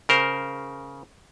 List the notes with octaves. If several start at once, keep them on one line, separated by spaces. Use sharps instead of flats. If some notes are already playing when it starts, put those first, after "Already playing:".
C#3 A#4 C5